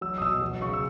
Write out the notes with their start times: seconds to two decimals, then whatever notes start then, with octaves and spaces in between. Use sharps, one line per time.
0.01 F#3 E6
0.18 D#6
0.21 B2 E6
0.42 F#3
0.62 C#3 C#6
0.73 E6